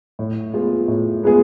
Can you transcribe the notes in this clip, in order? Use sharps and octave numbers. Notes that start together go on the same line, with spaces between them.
A2
G#3 B3 F4 G#4
A2
G#3 B3 F4 G#4